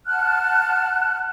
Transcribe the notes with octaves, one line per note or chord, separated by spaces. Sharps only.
F#5 A5 F6 F#6